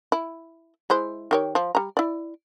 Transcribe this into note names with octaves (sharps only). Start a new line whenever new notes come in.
E4
G#3 E4 C5
D#3 G4 C#5
F3
G3 A#5
E4 D5